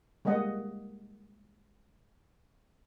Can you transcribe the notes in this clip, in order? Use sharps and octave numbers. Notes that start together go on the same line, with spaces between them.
G3 G#3 A#3 D#5 F#5